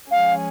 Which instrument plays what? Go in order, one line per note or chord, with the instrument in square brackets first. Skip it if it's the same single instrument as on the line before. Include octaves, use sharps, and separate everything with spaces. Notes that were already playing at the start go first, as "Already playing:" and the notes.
[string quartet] F3 G#3 C#4 G#4 [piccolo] F5